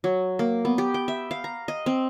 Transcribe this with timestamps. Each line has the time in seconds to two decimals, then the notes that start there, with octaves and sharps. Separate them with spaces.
0.04 F#3
0.39 A#3
0.65 B3
0.78 G4
0.94 G5
1.08 E5
1.31 F5
1.44 A#5
1.68 D#5
1.86 C4